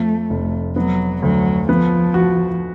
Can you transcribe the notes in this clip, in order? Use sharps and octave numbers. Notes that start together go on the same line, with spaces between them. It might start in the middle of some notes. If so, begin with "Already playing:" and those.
Already playing: F2 F3 A3
F1
F#3 B3
D2 F#3
F3 B3
F#4